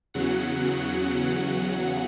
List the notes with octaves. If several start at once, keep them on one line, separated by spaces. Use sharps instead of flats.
E2 C#3 F#3 F#5